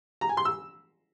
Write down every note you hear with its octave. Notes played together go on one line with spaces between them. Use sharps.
A#5
G#5
C6
E6